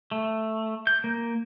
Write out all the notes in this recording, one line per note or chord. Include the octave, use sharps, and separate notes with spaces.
A3
G6
A#3